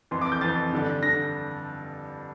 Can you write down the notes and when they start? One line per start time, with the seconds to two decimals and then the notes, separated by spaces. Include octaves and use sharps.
0.11 F2 E3 C6
0.22 D6
0.32 G6
0.41 F2 E3 A6
0.72 G2 D3
1.03 D3 A#6